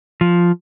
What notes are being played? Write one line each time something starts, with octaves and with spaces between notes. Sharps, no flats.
F3